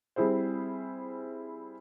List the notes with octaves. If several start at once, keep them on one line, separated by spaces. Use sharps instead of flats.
G3 C4 E4 G#4 C5